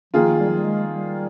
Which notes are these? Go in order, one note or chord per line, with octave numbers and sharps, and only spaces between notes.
D#3 F3 A#3 F4 G#4
G3
F3
G3
G#3
G3